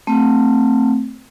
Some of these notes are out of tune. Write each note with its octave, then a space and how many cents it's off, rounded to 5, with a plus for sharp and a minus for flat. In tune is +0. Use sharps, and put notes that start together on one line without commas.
A3 +20 C4 +0